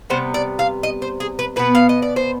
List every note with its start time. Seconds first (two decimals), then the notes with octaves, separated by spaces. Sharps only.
0.10 C3 G3 B3 C5
0.34 D5
0.59 F5
0.83 D#5
1.02 C5
1.20 G#4
1.39 B4
1.56 B2 B3 B4
1.75 F5
1.89 D#5
2.02 D5
2.16 C5